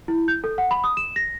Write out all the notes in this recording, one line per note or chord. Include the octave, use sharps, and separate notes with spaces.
E4
G6
A4
F#5
B5
D#6
E7
A#6